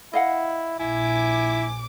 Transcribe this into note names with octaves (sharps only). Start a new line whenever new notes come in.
E4 D#5 F5 F#5
A#1 E4 G#5 D6